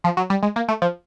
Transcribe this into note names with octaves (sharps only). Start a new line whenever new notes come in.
F3
F#3
G3
G#3
A#3
A3
F3